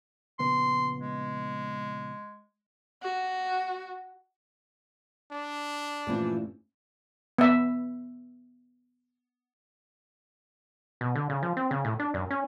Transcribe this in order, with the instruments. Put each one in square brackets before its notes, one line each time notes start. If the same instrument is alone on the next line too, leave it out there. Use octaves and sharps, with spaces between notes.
[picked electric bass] A#1 C#3 B3 [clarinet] C6
[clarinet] G#3
[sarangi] F#4
[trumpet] D4
[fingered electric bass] G2 A3 C#4 [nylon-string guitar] A#2 E3 F3
[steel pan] B3 E5
[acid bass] B2
D3
C#3
F3
C4
C#3
A2
D4
F#2
C#4